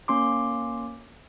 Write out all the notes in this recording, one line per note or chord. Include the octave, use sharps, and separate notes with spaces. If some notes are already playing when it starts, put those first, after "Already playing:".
A#3 C#4 C6 D6